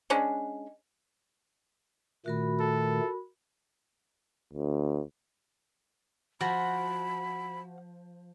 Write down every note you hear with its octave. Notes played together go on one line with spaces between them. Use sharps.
G#3 C#4 D4
A#2 D#3 A3 F#4 A#4 B5
A4
D2
F3 F#4 B5